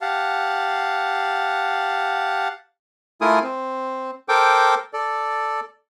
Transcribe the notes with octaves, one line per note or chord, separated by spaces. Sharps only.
G4 F5 F#5 A5
A3 E4 F4 A#4 G#5 D#6
C4
A4 A#4 C5 G5 D6
A4 D5